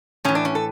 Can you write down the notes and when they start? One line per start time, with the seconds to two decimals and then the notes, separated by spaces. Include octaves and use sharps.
0.25 A2 E3 C#4
0.35 D4
0.45 C#4
0.55 A4